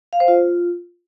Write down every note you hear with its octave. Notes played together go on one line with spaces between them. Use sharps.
F5
C5
F4